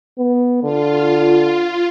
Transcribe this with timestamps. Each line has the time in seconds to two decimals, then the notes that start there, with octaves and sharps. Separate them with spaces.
0.19 B3
0.63 D3 F4